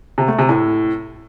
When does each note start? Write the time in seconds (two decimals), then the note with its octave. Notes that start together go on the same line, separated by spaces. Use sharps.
0.18 C3
0.28 A3
0.39 C3
0.49 A2